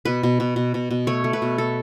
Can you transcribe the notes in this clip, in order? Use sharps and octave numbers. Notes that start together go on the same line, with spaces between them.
B2 B4
B2
B2
B2
B2
B2
A3 C#5
A3
B4
B2
B2 A4